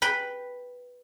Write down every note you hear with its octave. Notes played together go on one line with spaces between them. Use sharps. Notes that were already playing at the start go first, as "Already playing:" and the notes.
B4 G5 B5